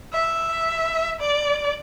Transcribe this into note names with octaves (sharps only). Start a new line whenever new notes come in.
E5
D5